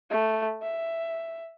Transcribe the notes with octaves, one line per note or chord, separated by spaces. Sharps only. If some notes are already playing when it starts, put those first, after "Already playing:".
A3
E5